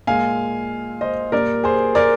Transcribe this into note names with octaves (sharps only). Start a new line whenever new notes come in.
A#2 G#3 F5 G#5
C5 D#5
A#2 G3 A#4 D5
G#4 C5
A#4 D5